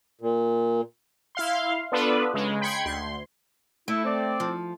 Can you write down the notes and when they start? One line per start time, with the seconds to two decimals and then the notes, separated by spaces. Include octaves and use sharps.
0.21 A#2
1.35 E4 F5 C6
1.92 B3 D4 F4 A4 B4
2.34 C#3 G#3
2.61 G5 B5 C6 G#6 C#7
2.85 D2 C6
3.88 A3 E4
4.05 C4 D5
4.40 F3